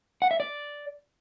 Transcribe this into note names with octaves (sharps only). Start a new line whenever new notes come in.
F#5
E5
D5